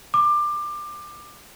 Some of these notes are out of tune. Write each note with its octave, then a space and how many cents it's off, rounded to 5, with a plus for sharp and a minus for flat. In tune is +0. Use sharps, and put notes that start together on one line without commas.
D6 +20